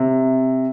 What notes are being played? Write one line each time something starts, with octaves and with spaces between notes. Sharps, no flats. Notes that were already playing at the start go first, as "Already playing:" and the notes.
Already playing: C3